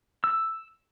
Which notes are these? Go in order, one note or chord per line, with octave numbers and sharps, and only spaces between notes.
E6